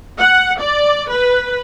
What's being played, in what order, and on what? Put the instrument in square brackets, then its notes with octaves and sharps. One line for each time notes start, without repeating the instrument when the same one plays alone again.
[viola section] F#5
D5
B4